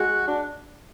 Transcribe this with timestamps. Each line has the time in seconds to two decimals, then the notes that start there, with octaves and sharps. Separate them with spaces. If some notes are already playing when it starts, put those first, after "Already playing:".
Already playing: G#3 F#4
0.28 D4